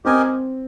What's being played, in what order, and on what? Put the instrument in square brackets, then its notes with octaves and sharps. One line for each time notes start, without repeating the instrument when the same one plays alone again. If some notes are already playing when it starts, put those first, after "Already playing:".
[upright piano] C4 [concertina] G4 A#4 D#5 G#5